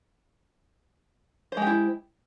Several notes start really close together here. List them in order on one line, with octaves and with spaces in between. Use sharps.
C5 G#3 G4 E4